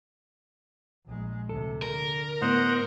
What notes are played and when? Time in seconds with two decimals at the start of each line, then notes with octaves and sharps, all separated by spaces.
1.07 A#1 G#3
1.49 D2 C3 A4
1.82 D3 A#4
2.42 A2 B3 C5 D#5 F#5